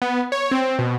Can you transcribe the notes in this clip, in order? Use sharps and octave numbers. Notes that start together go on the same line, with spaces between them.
B3
C#5
C4
B2